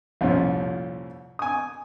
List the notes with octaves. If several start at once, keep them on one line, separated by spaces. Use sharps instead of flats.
C2 F2 A#2 C#4
G#5 D#6